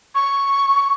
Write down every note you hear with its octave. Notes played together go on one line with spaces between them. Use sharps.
C#6